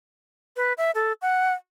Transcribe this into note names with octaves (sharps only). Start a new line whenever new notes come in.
B4
E5
A4
F#5